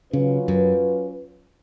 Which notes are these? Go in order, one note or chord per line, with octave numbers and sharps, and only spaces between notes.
C#3 F#3 C#4 F4 B4
F#2